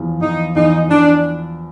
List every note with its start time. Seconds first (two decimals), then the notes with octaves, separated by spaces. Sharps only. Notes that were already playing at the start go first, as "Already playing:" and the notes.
Already playing: E2 F3
0.20 E2 D#4
0.55 E2 D#4
0.88 E2 D4